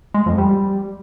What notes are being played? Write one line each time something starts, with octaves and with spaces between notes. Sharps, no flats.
G#3
F2
G3